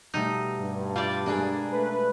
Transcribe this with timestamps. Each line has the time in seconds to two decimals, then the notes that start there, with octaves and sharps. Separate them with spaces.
0.14 B2 G3 A3 D#4
0.60 G2
0.96 G3 F4 D5 F5
1.26 G#3 A#3 D4 G#4
1.73 A3 B4